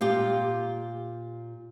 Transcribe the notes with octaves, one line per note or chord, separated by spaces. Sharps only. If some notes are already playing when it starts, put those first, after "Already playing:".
A#2 F4 G4